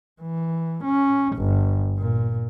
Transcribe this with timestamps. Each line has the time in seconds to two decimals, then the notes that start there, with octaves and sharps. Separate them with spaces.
0.22 E3
0.84 C#4
1.37 G1
1.98 A#2